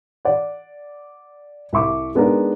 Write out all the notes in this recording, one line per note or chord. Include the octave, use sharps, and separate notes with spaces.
D5 F#5
C2 E5 C#6 D6
G#3 B3 D4 D#4 A#4